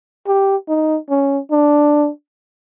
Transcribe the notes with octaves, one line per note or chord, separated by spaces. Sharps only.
G4
D#4
C#4
D4